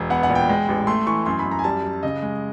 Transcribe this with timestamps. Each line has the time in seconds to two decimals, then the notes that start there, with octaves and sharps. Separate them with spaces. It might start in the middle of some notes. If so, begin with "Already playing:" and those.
Already playing: E1
0.10 B3 F#5
0.23 F#5
0.29 A#2
0.35 G5
0.49 G#3
0.68 A1
0.87 A3 C6
1.07 E3 C#6
1.26 F#2 C6
1.39 B5
1.46 F#2
1.51 A#5
1.59 G#5
1.64 G3 A5
1.84 G3
2.03 C#3 D#5
2.23 G#3